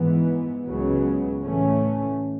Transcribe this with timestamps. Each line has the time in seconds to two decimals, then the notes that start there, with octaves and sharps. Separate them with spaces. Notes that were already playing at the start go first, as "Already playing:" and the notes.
Already playing: G#2 E3 B3
0.67 C#2 C#3 F#3 B3
1.42 A2 E3 A3 C#4